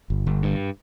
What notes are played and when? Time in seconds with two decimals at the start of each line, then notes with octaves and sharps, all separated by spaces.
0.10 G1
0.27 G1
0.42 G2